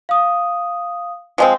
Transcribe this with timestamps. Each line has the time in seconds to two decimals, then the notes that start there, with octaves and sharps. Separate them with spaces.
0.09 F5 D#6
1.38 F3 G#3 C4